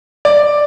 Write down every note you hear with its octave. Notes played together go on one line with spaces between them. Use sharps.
D5